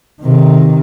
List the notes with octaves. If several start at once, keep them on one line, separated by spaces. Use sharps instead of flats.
C3 D#3